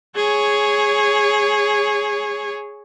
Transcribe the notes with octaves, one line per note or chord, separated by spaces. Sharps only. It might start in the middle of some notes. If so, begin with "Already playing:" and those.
G#4 C#5